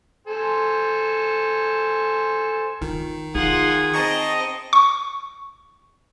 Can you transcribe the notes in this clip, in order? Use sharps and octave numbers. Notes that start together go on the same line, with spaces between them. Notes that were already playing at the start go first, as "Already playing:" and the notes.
A4 C5 G#5
D#3 F4
D#4 F4 G#4 F#5
C4 D#5 A5 A#5 C#6
C#6